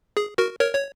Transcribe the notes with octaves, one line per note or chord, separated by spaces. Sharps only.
G#4
F#4 A#4
A#4 C#5
C#5